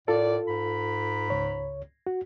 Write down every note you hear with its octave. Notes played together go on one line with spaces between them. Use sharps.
A2 F4 A4 A#4 D5
G#2 A#5 B5
C#2 C#5
F#4